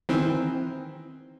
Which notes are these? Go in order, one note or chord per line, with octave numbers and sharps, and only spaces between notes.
D#3 E3 C4